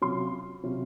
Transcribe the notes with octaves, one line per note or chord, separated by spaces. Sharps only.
C3 F#3 C#4 F4 C6
C3 F#3 C#4 F4